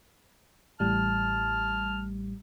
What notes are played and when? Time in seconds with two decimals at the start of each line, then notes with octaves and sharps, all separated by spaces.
0.80 A1 A2 G3 A5 F6